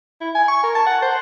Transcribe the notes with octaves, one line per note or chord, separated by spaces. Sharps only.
E4
G#5
C#6
A#4
A5
F#5
C5